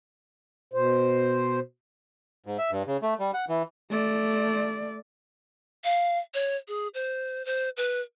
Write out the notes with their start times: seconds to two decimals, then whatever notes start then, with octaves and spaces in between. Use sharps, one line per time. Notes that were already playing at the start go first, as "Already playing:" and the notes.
0.74 B2 C5
2.46 G#2
2.58 E5
2.71 G2
2.87 C#3
3.02 A3
3.20 G3
3.34 F#5
3.49 E3
3.90 A3 D5
5.84 F5
6.34 C#5
6.68 G#4
6.94 C5
7.45 C5
7.77 B4